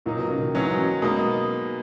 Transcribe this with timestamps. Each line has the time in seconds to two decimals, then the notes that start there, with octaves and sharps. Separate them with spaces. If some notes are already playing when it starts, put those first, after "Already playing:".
0.06 A#2 D#3 F#3 A#3 D#4
0.18 B2
0.30 C#3
0.42 D#3
0.54 G#2 D#3 E3 F#3 C#4
0.78 F#3
1.02 B2 G#3 A#3 D#4